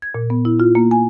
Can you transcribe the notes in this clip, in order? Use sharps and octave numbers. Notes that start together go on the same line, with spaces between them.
G#6
A#2
B3
E4
F4
A#3
G#5